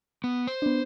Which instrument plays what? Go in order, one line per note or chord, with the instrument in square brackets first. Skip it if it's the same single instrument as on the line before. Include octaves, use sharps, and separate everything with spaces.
[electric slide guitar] B3
C5
[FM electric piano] B3 D4